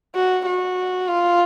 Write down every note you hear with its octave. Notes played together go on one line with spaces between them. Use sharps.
F#4
F#4
F4